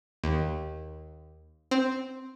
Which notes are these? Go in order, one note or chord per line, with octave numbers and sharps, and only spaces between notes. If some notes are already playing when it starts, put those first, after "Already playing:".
D#2
C4